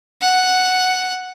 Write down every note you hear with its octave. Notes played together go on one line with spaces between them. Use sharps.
F#5